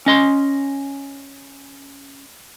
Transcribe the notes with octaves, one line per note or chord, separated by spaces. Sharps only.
C#4 D#5 C6